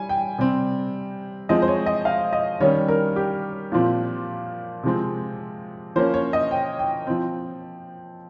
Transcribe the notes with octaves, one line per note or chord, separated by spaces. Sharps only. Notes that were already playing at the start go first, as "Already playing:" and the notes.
Already playing: G3 G#5
G5
C3 G3 C4
F3 G#3 C4 D#5
C5
C#5
D#5
F5
D#5
D#3 G3 C#4 C#5
A#4
G4
A#2 F3 C4
C3 F3 G#3 C4
F3 A#3 C#4 C5
C#5
D#5
G5
G5
F3 C4